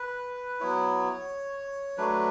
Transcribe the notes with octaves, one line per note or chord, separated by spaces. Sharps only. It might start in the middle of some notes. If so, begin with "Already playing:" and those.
Already playing: B4
F#3 B3 E4 C#5
F#3 A3 D4 B4